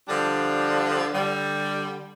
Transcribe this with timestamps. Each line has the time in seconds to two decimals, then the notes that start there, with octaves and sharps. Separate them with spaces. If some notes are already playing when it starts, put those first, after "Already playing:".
0.09 D3 F3 G3 D4
1.14 D3 G3